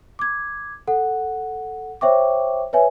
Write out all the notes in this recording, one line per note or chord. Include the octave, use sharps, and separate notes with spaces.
D6 G#6
A4 F#5
C5 C#5 E5 G5 C#6 D6
B4 C#5 E5 G#5